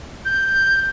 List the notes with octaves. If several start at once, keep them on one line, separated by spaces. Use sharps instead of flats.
G6